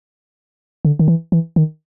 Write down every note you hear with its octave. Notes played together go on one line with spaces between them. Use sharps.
D3
D#3
E3
E3
D#3